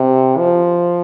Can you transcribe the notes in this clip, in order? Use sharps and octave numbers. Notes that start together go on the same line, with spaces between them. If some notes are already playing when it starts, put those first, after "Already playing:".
Already playing: C3
F3